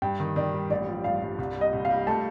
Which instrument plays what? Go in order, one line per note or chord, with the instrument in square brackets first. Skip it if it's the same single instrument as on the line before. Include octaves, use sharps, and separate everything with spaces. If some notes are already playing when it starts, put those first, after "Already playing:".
[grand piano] G2 [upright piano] G5
[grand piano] D#3
[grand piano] D#3 [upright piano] D5
[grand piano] G3
[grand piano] A1 [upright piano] D5
[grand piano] F3
[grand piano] G2 [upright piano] F5
[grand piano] G2
C2
G3
[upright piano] D#5
[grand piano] C2
[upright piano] F5
[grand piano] G3
[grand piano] A3 [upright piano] A5